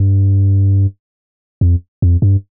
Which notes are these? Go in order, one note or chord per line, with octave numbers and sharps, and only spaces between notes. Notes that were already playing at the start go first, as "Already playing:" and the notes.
Already playing: G2
F2
F2
G2